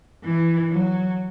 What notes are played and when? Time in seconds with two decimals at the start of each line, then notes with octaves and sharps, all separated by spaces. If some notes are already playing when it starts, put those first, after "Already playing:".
0.24 E3
0.71 F#3